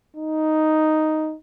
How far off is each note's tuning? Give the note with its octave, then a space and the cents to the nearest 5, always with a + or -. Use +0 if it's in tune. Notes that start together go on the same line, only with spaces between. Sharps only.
D#4 +0